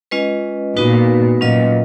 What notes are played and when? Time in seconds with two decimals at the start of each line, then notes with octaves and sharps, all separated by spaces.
0.11 G#3 C#4 F4 B4 D#5
0.77 A#2 B3 D#4 F#4 B4
1.40 A#2 F#3 C#4 F4 B4 D#5